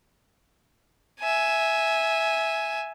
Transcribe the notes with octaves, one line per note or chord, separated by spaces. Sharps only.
E5 G#5